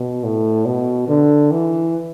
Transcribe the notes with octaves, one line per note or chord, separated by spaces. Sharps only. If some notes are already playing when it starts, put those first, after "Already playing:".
Already playing: B2
A2
B2
D3
E3